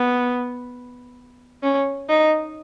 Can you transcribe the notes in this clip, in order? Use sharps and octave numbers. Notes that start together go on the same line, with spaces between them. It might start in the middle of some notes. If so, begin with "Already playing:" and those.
Already playing: B3
C#4
D#4